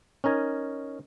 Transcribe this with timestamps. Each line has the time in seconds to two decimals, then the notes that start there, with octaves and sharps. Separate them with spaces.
0.24 C#4 D#4 A#4 G#5